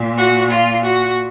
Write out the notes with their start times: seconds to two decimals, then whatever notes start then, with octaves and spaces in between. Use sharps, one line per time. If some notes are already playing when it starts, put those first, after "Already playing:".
Already playing: A#2
0.18 F#4
0.51 F4
0.86 F#4